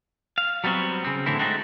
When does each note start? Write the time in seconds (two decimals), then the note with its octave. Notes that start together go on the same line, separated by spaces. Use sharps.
0.38 F5
0.64 F#3 G3 B3 C4 F#4
1.05 C#3 C4
1.26 A2 D3 E3 C4 E4
1.39 G#3 A3 C4 D#4 F#4